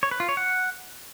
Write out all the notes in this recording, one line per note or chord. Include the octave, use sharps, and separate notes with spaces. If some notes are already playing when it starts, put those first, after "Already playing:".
C#5
B4
F4
C#5
F#5